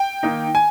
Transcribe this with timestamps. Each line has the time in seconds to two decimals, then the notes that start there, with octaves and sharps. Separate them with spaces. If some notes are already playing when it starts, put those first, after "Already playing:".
Already playing: G5
0.23 D#3 A#3 D#4
0.55 G#5